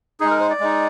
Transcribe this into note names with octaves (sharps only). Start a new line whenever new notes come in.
G#3 D#4 G#4
A#4
C5
D5
G#3 D#4